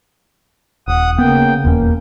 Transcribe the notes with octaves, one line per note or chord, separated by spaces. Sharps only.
D#1 F#5 D#6
C#3 A#3 B3 G5
D#1 E2 A#3 C#4